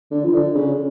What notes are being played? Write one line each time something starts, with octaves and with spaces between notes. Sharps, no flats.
D3
F3
D3
C#3